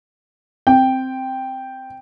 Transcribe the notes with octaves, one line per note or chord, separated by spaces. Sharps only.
C4 G5